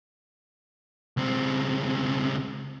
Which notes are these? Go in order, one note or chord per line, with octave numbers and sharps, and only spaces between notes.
C#2 C4